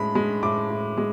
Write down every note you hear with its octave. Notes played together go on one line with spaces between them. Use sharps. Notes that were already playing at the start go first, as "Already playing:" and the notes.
Already playing: A2 G#3 B5
G#3
A2 D6
A2
G#3